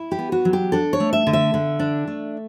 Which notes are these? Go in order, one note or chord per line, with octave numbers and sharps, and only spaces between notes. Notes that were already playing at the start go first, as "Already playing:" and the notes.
Already playing: E4
G4
B3
F#4
F#3
G4
D4 A4
C#5
A3
E5
D3
E5
D3
D4
A3